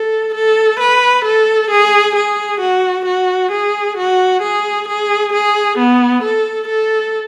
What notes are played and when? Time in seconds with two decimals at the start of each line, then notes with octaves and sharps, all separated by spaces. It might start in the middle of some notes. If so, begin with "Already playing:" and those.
Already playing: A4
0.35 A4
0.80 B4
1.25 A4
1.71 G#4
2.16 G#4
2.61 F#4
3.06 F#4
3.52 G#4
3.98 F#4
4.43 G#4
4.89 G#4
5.33 G#4
5.79 B3
6.23 A4
6.69 A4